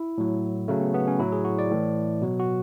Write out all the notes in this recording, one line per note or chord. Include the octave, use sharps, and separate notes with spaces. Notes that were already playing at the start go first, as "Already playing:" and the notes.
Already playing: E4
A2 F#3
C#3 F#3 A3
B3
B3
C#4
A2 F#3 E4
G#4
F#4
D5
A2 E3
B2 F#3
F#4